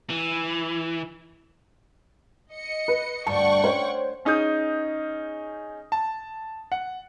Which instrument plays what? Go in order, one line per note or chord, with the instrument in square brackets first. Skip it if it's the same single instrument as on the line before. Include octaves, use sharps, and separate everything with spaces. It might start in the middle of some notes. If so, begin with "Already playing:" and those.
[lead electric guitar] E3
[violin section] D#5 C#7
[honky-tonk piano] B4
[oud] D2 G2 [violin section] F#5 G5 C#6 [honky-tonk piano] A5 C#7
[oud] C#4 [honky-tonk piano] C5 C#5
[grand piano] C#4 D#4 G#4 D#6 G6
A5
F#5